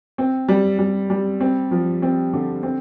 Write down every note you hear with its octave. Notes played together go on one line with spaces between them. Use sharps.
C4
G3
G3
G3
C4
F3
C4
D3
C4